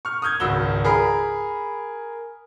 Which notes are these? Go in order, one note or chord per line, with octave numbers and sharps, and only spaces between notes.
C#6 F6
D#6 F6 G6 G#6
G#1 C#2 F#4 E6 G7
G#4 A#4 B5